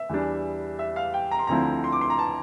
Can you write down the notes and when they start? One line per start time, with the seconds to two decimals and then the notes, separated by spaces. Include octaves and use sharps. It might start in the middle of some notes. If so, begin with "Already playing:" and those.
Already playing: E5
0.09 E2 E3 G3 D4
0.79 E5
0.96 F5
1.14 G5
1.31 A#5
1.39 C6
1.47 D2 D3 F3 C4 E4 A#5
1.84 C6
1.92 D6
2.01 C6
2.10 A#5
2.18 A5